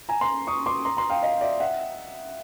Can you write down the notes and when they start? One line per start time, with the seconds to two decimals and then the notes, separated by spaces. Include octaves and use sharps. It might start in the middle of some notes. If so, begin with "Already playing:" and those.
0.09 G#5 A#5
0.21 A#5 C6
0.47 C#6 D#6
0.66 C6 D6
0.85 A#5 C6
0.97 A#5 C6
1.10 F5 G5
1.22 D#5 F5
1.41 D5 E5
1.60 E5 F#5